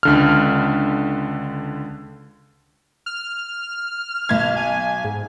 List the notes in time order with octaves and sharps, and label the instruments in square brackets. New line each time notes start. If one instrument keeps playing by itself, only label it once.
[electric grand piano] C#2 D3 F6
[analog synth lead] F6
[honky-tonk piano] B1 G#6
[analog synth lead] G#5
G#2